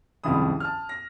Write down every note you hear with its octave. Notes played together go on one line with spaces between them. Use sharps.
F#1 C2 F2 D#3 B5 D#6
A5 F6
A#6